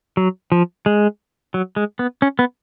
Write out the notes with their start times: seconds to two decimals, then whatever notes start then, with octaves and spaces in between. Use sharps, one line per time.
0.17 F#3
0.52 F3
0.86 G#3
1.54 F#3
1.76 G#3
1.99 B3
2.22 C#4
2.39 B3